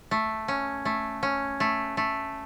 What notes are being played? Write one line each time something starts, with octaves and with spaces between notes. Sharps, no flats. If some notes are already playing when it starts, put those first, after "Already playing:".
A3
C#4
A3
C#4
A3
A3